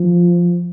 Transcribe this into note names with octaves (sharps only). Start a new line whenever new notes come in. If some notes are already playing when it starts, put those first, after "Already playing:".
Already playing: F3